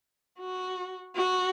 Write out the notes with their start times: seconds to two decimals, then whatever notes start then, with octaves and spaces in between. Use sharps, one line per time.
0.39 F#4
1.15 F#4